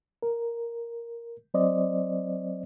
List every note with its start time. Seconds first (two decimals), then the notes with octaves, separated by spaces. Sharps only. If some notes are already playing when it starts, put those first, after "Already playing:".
0.23 A#4
1.54 F#3 C4 C5 D5 D#5